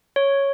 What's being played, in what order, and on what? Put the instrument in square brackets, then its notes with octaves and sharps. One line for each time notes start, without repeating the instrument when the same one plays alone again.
[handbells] C#5